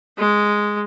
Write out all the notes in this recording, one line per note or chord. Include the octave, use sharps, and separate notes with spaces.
G#3